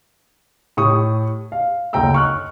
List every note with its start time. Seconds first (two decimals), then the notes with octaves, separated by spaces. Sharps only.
0.77 A2 G4 C#6 D#6
1.52 F5
1.93 F#1 D2 G5 A#5 E6
2.14 C#6 F6 F#6